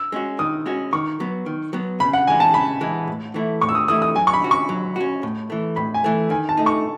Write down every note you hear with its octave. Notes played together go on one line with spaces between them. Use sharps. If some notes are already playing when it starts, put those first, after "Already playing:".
Already playing: E6
G#3 C#4 F#4
D#3 D#6
G#3 C#4 F#4
D#3 C#6
F#3 B3
D#3
F#3 B3
C#3 B5
F#5
E3 G#3 G#5
A5
C#3 B5
E3 G#3
A2
E3 A3 E4
A2 C#6
E6
D#6
E3 A3 E4 D#6
D#6
F#3 G#5
C#6
B5
C#4 F#4
C#6
F#3
C#4 F#4
A2
E3 A3
A2 B5
G#5
E3 A3
D#3 G#5
A5
A3 D#4
C#6